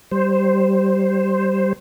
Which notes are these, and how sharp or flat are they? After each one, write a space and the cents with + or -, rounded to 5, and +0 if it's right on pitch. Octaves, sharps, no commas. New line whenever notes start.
G3 -15 C5 +0